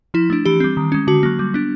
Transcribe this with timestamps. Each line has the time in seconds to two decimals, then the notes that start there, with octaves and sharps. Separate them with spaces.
0.14 F3 E4
0.30 A3 D4
0.45 E3 G4
0.60 G3 C4
0.77 D#3
0.92 G#3 C#4
1.07 D3 F#4
1.23 F#3 A#3
1.39 G3
1.54 B3 D4